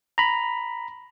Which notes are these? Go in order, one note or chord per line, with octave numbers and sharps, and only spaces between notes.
A#5 B5